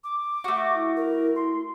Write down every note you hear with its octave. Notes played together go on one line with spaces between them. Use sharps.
D6
A3 F#4
E4
A#4
C6